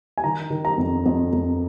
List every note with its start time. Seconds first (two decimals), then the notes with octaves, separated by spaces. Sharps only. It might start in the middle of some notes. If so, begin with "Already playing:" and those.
0.18 G#5
0.24 D#3 A#5
0.50 D#3
0.65 A#5
0.78 F2
1.06 F2
1.33 F2